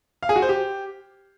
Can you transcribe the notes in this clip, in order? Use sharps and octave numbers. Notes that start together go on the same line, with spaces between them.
F5
G#4
F#4
C5
G4